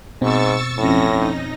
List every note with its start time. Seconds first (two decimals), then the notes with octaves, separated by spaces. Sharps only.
0.22 G#2 B2 C4 C#6 E6 A6
0.78 F2 A2 C#4 A#6
1.15 D#4